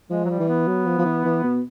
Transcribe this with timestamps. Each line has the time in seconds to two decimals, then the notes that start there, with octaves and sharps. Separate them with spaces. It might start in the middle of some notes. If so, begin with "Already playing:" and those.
0.10 F3 G#3
0.24 F#3
0.29 G3
0.39 E3
0.48 B3
0.68 F#3
0.86 F3
0.98 F3
1.05 E3
1.25 E3
1.44 B2